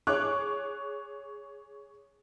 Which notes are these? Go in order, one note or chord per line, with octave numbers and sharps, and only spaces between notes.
G#4 C#5 C#6 D6 F#6